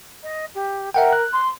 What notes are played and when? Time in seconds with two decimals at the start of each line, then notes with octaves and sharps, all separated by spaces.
0.23 D#5
0.54 G4
0.94 A#4 E5 F#5 G5
1.13 F#6
1.33 C6